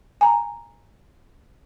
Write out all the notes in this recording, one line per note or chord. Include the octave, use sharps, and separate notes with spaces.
G#5 A#5